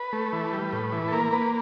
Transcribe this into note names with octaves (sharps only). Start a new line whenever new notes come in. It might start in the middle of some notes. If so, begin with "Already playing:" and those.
Already playing: B4
A3
E3
G3
A2
E3
A4
A#3 A#4
A#3 B4